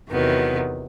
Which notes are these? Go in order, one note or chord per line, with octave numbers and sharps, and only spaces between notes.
E2 C3 D#3 F#3 B3